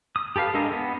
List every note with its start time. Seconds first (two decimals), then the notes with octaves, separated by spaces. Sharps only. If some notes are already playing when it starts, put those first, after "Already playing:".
0.16 D#6
0.36 G4 A4 B4 F5
0.54 G#3 D4 A4 A#4 D#5
0.72 B3